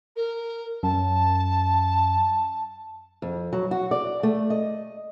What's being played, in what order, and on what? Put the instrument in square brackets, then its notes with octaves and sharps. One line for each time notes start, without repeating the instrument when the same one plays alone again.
[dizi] A#4
[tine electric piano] F#2 [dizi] A5
[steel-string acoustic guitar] F2
F#3
F#4
D5
A3
D#5